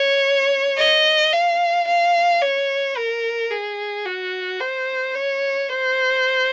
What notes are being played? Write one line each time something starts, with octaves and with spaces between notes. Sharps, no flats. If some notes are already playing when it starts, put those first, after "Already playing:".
Already playing: C#5
D#5
F5
F5
C#5
A#4
G#4
F#4
C5
C#5
C5